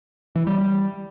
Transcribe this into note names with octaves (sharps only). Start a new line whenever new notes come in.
E3
G3
G3